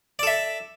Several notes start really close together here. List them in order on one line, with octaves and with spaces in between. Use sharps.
D5 A4 E5